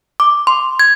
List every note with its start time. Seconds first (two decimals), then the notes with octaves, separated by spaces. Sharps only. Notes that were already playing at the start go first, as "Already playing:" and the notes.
0.20 D6
0.47 C6
0.79 G#6